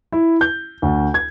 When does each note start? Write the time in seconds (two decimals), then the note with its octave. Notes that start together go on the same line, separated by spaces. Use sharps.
0.12 E4
0.41 G6
0.82 D2
1.14 G#6